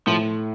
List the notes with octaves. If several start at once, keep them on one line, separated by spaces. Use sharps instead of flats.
A2 F3